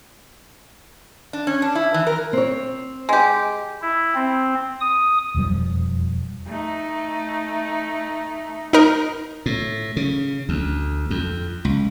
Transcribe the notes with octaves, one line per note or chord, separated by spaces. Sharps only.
D4
C#4
D4
E4
E3
A#4
C4 C#5
G#3 G4
E4
C4
D#6
E1 F2 F3 G3
A3 D#4
D#4 A#4
A2
C#3
D2
F2
C#2